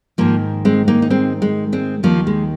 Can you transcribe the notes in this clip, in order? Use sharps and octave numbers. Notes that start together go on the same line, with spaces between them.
G#2 D#3 F3 A#3
G#3 C4
A#3 D#4
D#4
G#3 C4
G#3
G#3 C4
D#2 D#3 F3 A#3
G#3